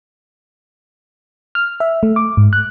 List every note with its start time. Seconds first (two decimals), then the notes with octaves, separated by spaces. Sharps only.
1.55 F6
1.80 E5
2.03 A3
2.16 D6
2.37 G#2
2.53 F#6